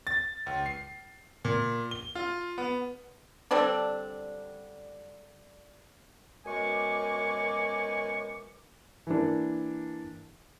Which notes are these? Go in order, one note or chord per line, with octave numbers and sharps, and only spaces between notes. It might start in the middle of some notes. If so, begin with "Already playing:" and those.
A6
C#2
C7
A#2
G7
F4
B3
D3 G3 C4 D4
F#2 B2 G#3 G#5 C#6 D6
E3 A#3 D4